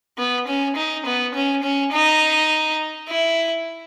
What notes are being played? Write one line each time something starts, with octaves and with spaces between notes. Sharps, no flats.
B3
C#4
D#4
B3
C#4
C#4
D#4
E4